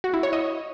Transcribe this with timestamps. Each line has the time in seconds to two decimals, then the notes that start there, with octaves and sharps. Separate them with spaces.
0.04 F#4
0.14 E4
0.23 C#5
0.33 D#5